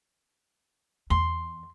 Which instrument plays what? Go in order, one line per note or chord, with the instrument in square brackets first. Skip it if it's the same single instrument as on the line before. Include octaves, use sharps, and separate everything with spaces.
[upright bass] E2 [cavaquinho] C6